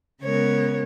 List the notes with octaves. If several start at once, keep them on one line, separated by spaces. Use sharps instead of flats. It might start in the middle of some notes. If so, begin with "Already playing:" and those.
C#3 G#3 B3 A#4 C#5